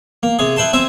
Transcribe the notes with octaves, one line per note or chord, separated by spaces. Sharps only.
A#3
C3 G#4
E4 B4 G5 A5 C6
C4 E5 G#5